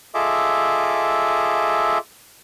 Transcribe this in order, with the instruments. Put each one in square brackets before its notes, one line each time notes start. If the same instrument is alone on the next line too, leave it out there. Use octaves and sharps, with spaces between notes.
[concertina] F4 G#4 A4 D#5 E5 D6